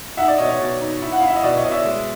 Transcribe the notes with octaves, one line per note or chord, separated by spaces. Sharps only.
D#4 E5 F#5
D5
B2 C#5 D#5
C#5
B2
D#4
E4
F#5
E4 F5
E5
D#5
B2 D5
C#5 D#5
B2
D5 E5
G#3